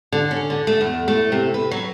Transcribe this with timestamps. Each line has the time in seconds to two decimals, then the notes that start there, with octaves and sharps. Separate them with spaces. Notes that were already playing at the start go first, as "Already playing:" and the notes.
0.12 D3
0.31 C#4
0.50 D3
0.67 A3
0.81 E2
1.08 A3
1.32 C3
1.54 B4
1.71 F#3